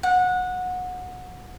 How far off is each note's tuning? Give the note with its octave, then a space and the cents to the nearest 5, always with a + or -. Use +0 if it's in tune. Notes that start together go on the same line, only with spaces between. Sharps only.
F#5 -20